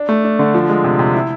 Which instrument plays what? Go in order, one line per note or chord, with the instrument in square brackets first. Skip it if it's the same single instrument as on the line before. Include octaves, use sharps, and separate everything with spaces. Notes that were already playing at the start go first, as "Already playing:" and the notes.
Already playing: [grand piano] D4
A3
D4
D3
F3
G#3
C3
C3
E4